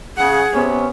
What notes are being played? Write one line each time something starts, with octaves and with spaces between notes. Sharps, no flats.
C#3 G#4 F#5
C3 B3 C#4